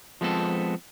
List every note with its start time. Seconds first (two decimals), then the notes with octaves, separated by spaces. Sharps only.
0.21 F3 G#3 B3 C4 A4